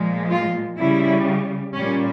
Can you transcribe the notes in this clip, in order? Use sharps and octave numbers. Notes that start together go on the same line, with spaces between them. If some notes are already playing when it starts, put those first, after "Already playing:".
Already playing: A#2 F3 G#3
F4
C#3 G3 E4
A#2 G3 C#4